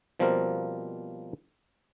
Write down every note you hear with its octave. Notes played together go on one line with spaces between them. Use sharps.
B2 F3 G3 A#3 C4 A#4